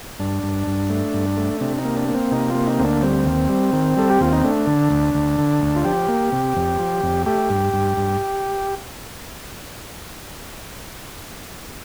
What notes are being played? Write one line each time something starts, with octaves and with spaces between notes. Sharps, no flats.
G2 D4
G2
G2
A3
G2
A3
C3 D4
D#4
A#3
D4
A#3
C4
C3 D#4
A#3 F4
D#4
D2 C4
D4
G3 C4
D#2
G3
D#3
G3 A4
G4
D#2 F4
D#4
A3 D4
D3
D2
D2
D3
D2
F4
F3 G4
A#3
C3
F2
F3
F2
A3 G4
G2
G2
G2